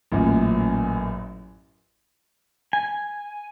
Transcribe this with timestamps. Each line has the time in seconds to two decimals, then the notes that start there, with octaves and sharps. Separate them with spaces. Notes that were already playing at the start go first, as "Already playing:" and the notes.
0.12 A1 F#2 A#2
2.73 G#5